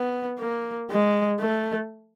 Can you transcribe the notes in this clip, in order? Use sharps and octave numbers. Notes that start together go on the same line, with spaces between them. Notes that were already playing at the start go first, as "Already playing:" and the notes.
Already playing: B3
A#3
G#3
A3